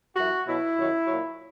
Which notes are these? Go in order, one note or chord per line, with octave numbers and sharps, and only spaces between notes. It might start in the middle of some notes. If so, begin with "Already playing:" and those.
F#2 E3 F#4
B2 F#3 E4
F#2 D#3 F#3
A#2 F#3